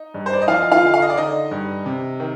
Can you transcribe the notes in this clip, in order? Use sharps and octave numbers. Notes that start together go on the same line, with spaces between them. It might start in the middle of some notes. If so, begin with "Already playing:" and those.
Already playing: D#4
G2
C5
D5
D#5
F3 F4 F5
F4 F5
D3
F5
D#5
D5
D3 D#4 D#5
G2
C3
D#3